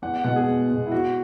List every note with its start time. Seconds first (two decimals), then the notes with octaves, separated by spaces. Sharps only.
0.02 E2 F#5
0.14 F#5
0.24 B2 G#3 F#5
0.36 G#4
0.47 E2
0.70 B2 G#3
0.86 E4
0.92 E2 F#4